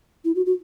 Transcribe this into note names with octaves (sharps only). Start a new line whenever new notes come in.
E4
F#4
F#4